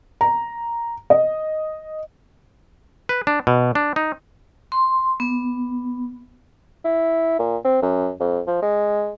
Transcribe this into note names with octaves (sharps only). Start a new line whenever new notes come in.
A#5
D#5
B4
D4
B2
D4
D#4
C6
B3
E4
A#2
C4
F#2
F2
F3
G#3